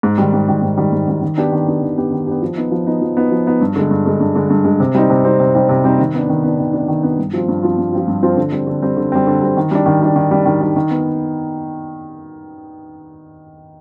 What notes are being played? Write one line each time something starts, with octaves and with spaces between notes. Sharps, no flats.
G#2
D#3 G3
G#2
D#3 G3
G#2
D#3 G3
G#2
D#3 G3
D#3
B3 D4 G4
D#3
B3 D4 G4
D#3
B3 D4 G4
D#3
B3 D4 G4
F3
B3 D#4
F3
B3 D#4
F3
B3 D#4
F3
B3 D#4
G2
D3 G#3
G2
D3 G#3
G2
D3 G#3
G2
D3 G#3
C3
G3 C4 D#4
C3
G3 C4 D#4
C3
G3 C4 D#4
C3
G3 C4 D#4
D#3
B3 D4
D#3
B3 D4
D#3
B3 D4
D#3
B3 D4
G2
F3 C4 F4
G2
F3 C4 F4
G2
F3 C4 F4
G2
F3 C4 F4
D3
G3 C4
D3
G3 C4
D3
G3 C4
D3
G3 C4
D#3
G3 D4
D#3
G3 D4
D#3
G3 D4
D#3
G3 D4
D#3
B3